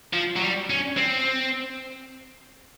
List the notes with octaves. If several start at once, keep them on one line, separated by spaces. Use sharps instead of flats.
F3
F#3
G3
C#4
C4